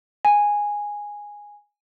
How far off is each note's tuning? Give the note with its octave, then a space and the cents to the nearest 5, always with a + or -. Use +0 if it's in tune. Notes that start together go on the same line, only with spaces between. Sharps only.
G#5 -10